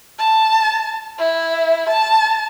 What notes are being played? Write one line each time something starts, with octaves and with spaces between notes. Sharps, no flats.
A5
E4
A5